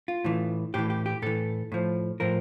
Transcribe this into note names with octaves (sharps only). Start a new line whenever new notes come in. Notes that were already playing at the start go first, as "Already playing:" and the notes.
F4
A2 E3
A2 E3 G4
G4
G4
A2 E3 A4
A2 F3
A2 F3 A#4